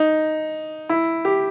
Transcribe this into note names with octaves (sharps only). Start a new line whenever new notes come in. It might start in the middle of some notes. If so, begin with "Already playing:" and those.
Already playing: D#4
E4
G4